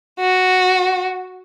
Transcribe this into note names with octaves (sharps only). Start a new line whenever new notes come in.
F#4